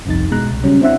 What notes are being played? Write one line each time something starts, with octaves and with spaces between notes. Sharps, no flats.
G1 C2 F2 D#4 A6
B2 G#3 A#5 F#6
C2
C#3 F#3 G3 C#4
C4 D4 E4 C5 E5 F#5